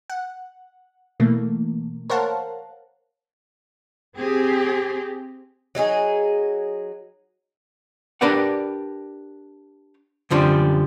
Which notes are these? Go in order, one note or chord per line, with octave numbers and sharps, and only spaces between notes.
F#5
B2 E3 A3 A#3
A#4 C5 C#5 F5 F#5 A5
C4 G4 G#4
F#3 D#4 E4 G#4
D4 G4 A#4 B4 D5 F#5
F#2 D3 F3 G3 C4